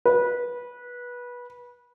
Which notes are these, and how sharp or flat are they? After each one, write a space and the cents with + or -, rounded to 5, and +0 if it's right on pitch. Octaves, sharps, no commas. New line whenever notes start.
B4 -20